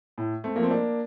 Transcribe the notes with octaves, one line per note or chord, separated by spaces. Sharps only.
A2
A3 C4
F3 A#3
C4
A#3 D4